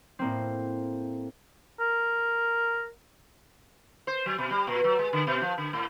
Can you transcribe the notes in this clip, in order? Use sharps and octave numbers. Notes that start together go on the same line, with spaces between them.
A2 A#3 C4
A#4
C5
F#3
B2
G3
A#2
F#3
G#3
D3
B2
F3
D3
A2